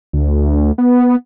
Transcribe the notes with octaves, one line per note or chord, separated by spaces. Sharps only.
D2
B3